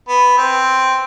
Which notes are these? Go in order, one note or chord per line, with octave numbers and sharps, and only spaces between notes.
B3
C4